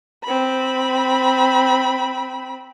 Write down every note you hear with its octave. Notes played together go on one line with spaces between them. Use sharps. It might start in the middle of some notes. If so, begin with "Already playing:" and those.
C4 B5